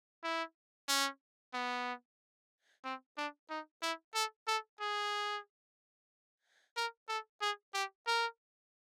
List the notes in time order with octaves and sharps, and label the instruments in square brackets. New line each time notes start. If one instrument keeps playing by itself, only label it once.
[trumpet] E4
C#4
B3
C4
D4
D#4
E4
A4
A4
G#4
A#4
A4
G#4
G4
A#4